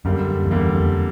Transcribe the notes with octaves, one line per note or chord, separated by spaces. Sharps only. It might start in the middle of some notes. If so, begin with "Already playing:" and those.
F#2 D3 G3 A#3
F2
E2 D3 G3 A#3
F2